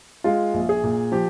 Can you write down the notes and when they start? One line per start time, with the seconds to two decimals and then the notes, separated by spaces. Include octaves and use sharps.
0.24 G#3 F4
0.54 A#1
0.69 G#4
0.84 A#2
1.12 F3 G4